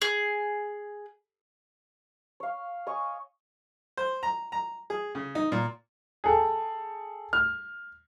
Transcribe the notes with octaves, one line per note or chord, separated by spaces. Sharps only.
G#4
C#5 F5
C#5 D#5 G#5 C#6
C5
A#5
A#5
G#4
C#3
D#4
A#2
G#4 A4 G5
F6